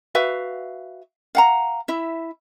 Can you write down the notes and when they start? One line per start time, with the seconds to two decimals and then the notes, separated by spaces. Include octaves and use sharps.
0.15 F#4 B4 E5 F5
1.35 F5 F#5 A#5
1.88 E4 E5